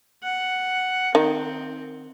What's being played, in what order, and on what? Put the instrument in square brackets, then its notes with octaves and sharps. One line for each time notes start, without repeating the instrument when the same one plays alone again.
[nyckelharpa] F#5
[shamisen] D#3 [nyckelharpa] C4